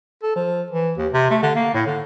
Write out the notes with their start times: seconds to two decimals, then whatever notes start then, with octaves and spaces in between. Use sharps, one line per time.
0.23 A4
0.36 F3
0.71 E3
0.98 D#2
1.13 C3
1.30 A3
1.43 D3
1.55 A#3
1.74 A2
1.86 D3